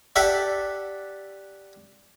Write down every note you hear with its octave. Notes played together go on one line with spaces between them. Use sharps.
G4 A4 D5 E5 F#5